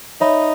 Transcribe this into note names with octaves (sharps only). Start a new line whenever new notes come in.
D#4 C#5 E5 B5